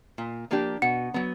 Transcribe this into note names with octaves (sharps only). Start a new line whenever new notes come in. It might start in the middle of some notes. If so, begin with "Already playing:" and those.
A#2
F3 A#3 D4 G4
B2 F#5
F#3 B3